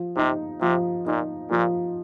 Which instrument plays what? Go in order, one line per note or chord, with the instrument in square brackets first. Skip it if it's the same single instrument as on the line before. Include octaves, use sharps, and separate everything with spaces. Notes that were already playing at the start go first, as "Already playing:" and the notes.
Already playing: [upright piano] F3
[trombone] C3 [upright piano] D#4
[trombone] C3 [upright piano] F3
[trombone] A#2 [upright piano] D#4
[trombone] A#2 [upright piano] F3